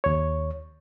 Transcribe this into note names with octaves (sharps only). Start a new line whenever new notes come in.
D#2 C#5